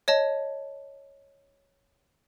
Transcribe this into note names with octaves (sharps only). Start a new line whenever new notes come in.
C#5 D#5 A5